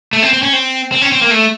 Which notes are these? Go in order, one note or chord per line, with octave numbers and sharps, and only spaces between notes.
A3
C4
C4
C#4
C4
C4
C#4
C4
A#3
A3